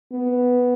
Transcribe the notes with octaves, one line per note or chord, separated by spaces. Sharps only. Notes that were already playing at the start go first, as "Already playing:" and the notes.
B3